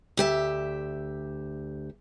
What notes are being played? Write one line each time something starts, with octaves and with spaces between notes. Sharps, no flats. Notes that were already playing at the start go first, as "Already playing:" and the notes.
D2 G4 E5